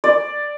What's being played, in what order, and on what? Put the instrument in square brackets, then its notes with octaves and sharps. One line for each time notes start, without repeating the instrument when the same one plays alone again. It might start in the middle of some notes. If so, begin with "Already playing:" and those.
[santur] D5